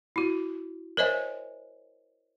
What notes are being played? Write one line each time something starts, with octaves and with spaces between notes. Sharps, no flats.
E4 F#4
A#4 C5 C#5 D#5 E5 G#5